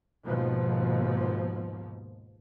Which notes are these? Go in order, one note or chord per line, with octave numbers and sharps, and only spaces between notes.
D#2 G#2 B2 F3